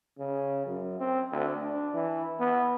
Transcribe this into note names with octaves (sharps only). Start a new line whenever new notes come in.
C#3
F#2
C4
D2
D4
E3
B3